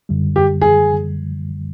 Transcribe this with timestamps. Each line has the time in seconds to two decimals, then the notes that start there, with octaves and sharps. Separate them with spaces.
0.09 F#2 D3 G3
0.36 G4
0.62 G#4